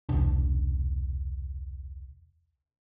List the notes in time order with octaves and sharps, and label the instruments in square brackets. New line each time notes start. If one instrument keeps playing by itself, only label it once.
[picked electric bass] E1 C2 D4